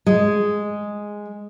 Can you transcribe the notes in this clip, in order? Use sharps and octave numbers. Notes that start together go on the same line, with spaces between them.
G#3